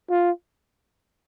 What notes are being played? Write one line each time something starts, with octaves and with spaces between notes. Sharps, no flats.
F4